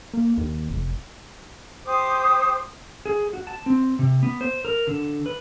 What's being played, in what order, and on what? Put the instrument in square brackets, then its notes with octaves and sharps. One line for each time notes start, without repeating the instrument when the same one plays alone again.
[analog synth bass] A#3
D#2
F1
[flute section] G4 C5 D6 D#6
[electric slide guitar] G#4
F#4
A5
C4
C3
B3
C5
A#4
D3
B4